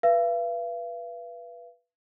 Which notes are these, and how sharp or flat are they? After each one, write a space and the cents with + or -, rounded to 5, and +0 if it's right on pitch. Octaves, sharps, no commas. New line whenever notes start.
B4 -15 F5 -45